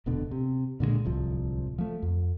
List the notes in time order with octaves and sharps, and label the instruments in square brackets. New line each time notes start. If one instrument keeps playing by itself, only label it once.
[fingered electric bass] E1 D2 B2 D3
C3
A#2 D3 E3 G#3
D1 C2 F3
F3 A3
F2